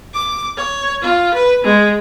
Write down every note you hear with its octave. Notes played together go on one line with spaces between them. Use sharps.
D6
C#5
F4
B4
G#3